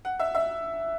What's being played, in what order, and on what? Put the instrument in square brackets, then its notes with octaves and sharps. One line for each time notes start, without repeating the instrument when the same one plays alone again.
[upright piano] F#5
E5
E5